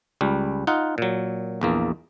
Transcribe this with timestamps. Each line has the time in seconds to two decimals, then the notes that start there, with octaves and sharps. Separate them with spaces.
0.21 C#2 G3
0.67 D#4 F4 F#5
0.98 A#2 F#3
1.61 A#1 E2 A#3